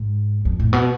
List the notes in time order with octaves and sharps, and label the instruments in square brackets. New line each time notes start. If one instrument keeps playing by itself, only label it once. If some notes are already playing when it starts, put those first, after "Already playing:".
Already playing: [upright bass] G#2
F2
A2
B2